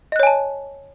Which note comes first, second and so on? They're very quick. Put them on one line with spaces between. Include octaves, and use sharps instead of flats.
D#5 F#6 C#5 G#5 A5